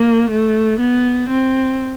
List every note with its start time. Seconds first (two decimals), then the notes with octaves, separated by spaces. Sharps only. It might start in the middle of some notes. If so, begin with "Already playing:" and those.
Already playing: A#3
0.30 A3
0.80 B3
1.29 C4